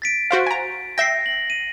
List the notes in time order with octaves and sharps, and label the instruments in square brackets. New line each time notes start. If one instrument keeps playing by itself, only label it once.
[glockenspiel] A6 B6 D7
[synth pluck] F#4 C5 F5
G#5 A#5
[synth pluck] E5 G5 [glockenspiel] A#6 C7
[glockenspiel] F#7
D#7